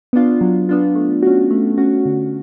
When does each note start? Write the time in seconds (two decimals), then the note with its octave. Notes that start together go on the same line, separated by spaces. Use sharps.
0.13 B3 D4 F4
0.41 F#3
0.69 B3 D4 F4
0.95 A3
1.23 C#4 F#4
1.51 A3
1.78 C#4 F#4
2.06 D3